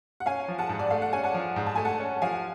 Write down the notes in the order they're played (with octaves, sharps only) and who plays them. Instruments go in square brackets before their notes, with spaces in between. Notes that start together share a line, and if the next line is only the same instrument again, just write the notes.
[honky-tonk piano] F#5
[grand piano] C#4 [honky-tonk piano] F5 G#5
[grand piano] F3
[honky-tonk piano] F#5 A5
[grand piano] G#2
[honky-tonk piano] D5
[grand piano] A3 [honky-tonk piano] F5
[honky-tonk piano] F#5
[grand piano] C#4 [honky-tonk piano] G#5
[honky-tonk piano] F#5 A5
[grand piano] F3
G#2
[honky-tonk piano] A5
[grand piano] A3 [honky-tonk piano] G#5
[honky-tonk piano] F#5 A5
[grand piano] C#4
[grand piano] F3 [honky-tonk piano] F5 G#5